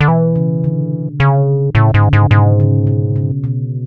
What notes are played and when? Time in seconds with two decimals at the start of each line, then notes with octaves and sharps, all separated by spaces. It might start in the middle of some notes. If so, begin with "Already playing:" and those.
0.01 D3
0.08 B2 E3
0.36 C#3
0.64 D3
1.20 C#3
1.75 A2 C#3
1.89 C#3
1.94 G#2
2.03 D3
2.13 G#2 C#3
2.31 G#2 B2
2.60 C#3
2.87 B2
3.16 C#3
3.44 B2